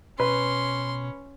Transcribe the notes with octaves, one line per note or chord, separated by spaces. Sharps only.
B2 C#4 B4 C6